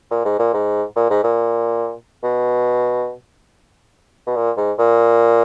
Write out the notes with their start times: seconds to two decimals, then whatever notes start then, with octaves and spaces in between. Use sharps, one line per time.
0.11 A#2
0.25 G#2
0.39 A#2
0.53 G#2
0.95 A#2
1.10 G#2
1.24 A#2
2.23 B2
4.27 B2
4.36 A#2
4.57 G#2
4.79 A#2